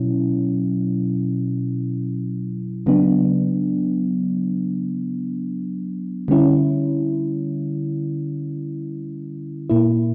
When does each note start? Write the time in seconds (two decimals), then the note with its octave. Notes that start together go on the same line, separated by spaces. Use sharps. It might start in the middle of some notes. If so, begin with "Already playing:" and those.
Already playing: B2 F#3 C#4 E4
2.86 C#3 F#3 B3 D4
6.28 D3 G3 C#4 E4
9.70 A#2 A#3 E4